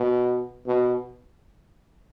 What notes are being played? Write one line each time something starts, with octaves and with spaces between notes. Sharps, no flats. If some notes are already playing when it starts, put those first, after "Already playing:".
Already playing: B2
B2